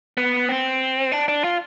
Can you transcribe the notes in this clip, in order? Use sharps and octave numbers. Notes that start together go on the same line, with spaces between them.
B3
C4
D4
D4
F4